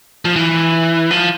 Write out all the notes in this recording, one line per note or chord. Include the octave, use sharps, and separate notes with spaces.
F3
E3
F3